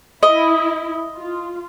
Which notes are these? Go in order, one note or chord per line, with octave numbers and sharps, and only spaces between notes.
E4 D#5
F4